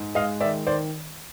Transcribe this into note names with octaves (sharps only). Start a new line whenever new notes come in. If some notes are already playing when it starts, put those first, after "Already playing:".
Already playing: G#2
G#3 D#5 F5
D#3 D5 E5
D#3 C5 D5